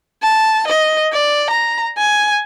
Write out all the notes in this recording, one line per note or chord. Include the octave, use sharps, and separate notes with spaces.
A5
D#5
D5
A#5
G#5